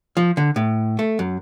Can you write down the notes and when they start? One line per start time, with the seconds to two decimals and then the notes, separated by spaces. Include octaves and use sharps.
0.17 F3
0.37 D3
0.56 A2
0.99 A3
1.19 F#2